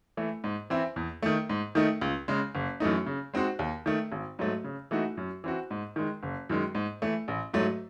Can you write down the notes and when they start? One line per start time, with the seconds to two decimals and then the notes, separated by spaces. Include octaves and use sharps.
0.17 E3 A3
0.44 G#2
0.70 E3 C4 E4
0.96 E2
1.22 D#3 A3
1.49 G#2
1.75 D#3 A3 D#4
2.01 C#2
2.28 C#3 G#3
2.55 F#1
2.80 F#2 E3 A3 D#4
3.06 C#3
3.34 G#3 C4 D#4 F#4
3.59 D#2
3.86 D#3 A3
4.12 G#1
4.39 G#2 F#3 A3
4.64 C#3
4.91 E3 A3 D#4 F#4
5.17 F#2
5.44 E3 C4 F#4
5.71 G#2
5.96 D#3 G#3
6.23 F#1
6.50 F#2 D#3 G#3
6.75 G#2
7.02 E3 A3
7.28 A1
7.54 G#2 F#3 A3